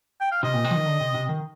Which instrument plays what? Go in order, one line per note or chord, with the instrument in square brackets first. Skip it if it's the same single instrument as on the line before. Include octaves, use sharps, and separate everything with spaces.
[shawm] G5
F5
[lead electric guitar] C3 [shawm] D#5
[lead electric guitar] A#2
C3
F3
D#3
D3
C3
C3
D#3